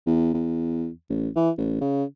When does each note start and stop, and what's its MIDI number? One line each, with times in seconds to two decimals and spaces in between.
0.06 0.32 40
0.34 0.89 40
1.09 1.29 33
1.36 1.50 52
1.58 1.77 33
1.81 2.04 49